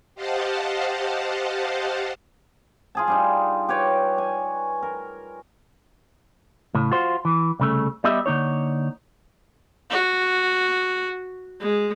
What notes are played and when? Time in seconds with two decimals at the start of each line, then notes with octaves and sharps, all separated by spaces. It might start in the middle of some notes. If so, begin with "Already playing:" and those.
0.15 G4 C5 D#5 F5 F#5 A5
2.95 F4 G#4 A5
3.07 G3 D4 D#4
3.69 G4 B4 C#5 D5
4.18 G#5
4.83 A#4
6.75 A2 C#3
6.92 F4 F#4 C5
7.25 E3
7.60 C2 C#3 A3
8.04 G3 B3 G4 D#5 E5
8.26 D3 A#3 D#4 C#5
9.91 F#4
11.60 G#3